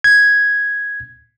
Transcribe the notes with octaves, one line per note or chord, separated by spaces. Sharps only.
G#6